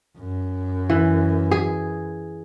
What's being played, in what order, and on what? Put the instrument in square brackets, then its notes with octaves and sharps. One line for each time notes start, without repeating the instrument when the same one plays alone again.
[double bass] F#2
[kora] E3
G#4